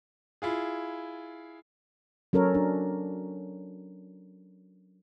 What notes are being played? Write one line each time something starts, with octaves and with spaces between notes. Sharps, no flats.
E4 F4 G#4
F#3 C#4 A4 A#4 C#5
D4